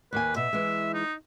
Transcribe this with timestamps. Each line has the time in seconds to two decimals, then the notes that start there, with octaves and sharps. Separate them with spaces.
0.13 D#2 A#3 B4 G#5
0.37 B2 E5
0.53 E3 G#3
0.94 D#4